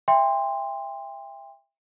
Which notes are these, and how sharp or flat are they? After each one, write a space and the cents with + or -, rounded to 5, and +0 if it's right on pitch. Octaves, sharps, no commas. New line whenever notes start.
E5 +5 G5 +35 C6 +0